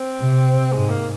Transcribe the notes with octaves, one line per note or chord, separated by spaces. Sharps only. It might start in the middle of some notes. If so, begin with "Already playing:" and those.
Already playing: C4
C3
G#2 G#3
A#3